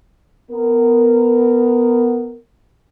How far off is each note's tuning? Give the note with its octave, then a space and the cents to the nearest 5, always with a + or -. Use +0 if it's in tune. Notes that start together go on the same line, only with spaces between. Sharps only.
B3 +0 A#4 -15